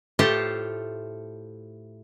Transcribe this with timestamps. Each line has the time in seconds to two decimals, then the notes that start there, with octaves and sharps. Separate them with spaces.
0.19 A2 A3 F4 G4 C5 A5